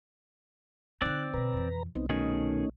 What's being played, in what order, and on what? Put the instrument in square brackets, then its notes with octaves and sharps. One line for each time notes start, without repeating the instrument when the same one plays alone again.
[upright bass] D3 D#4 [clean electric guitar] C4 D5 [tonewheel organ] F#6
[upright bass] B2 D3 [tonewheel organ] B4 A#5
[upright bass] F2 E3
[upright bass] C2 [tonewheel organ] B3 C4 D#4
[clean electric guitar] B2 D#3 G#4 [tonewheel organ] A3 C#4 D#4